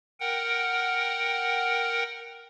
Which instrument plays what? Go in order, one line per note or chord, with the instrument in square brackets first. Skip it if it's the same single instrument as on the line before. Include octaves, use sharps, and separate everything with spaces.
[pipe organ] A#4 F#5 G5